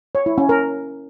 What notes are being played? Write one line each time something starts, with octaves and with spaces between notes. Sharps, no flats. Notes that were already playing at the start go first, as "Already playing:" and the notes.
C#5
E4
C#4
A#4